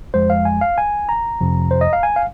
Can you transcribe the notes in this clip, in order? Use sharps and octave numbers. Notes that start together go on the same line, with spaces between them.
F2 F3 G#3 C5
F5
G#5
F5
G#5
A#5
F2 C3 F3
C5
D#5
F5
G#5
F5